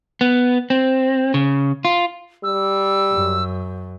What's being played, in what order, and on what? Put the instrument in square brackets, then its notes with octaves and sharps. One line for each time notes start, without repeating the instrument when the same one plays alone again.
[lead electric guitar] B3
C4
C#3
F4
[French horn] G3 [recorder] E6
[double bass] F#2